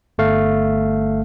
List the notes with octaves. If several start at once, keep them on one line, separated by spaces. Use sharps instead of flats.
G1 A3 F5